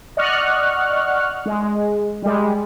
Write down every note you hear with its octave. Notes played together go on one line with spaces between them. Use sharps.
D5 D#5 F#5 C#6 F6 F#6
G#3
G3 G#3